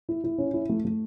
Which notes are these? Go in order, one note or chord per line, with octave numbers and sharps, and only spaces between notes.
E4
E4
C#4
E4
A3
A3